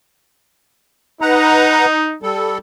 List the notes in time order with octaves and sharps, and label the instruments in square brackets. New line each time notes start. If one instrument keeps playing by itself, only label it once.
[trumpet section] D#4 [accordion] B4 F#5 A#5
[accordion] G3 A4